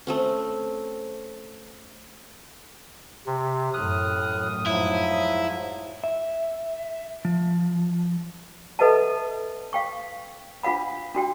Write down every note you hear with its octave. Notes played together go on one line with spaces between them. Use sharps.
A3 C4 C#4
C3
A1 F#2 A2 D#6 F6 F#6
G#2 F3 F#3 E4
E5
F3
A4 B4 D#5 E5 F#5 A5
F5 G5 C#6
D4 F4 F5 F#5 B5
D4 F#4 G5